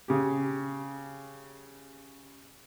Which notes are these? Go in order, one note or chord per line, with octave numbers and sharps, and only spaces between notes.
C#3 G4